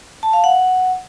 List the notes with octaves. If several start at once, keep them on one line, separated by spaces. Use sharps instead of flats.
A5
F5
F#5